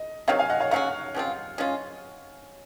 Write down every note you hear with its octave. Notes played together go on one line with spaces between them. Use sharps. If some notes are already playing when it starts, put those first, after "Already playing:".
Already playing: D#5
C3 D#3 F#3 C#5 F5
F5 G#5
D#5 F#5
C#5 F5
C#3 F#3 C#4 F#4 C#5 F5
C#3 F3 C4 F4
C#3 G#3 C#4 F4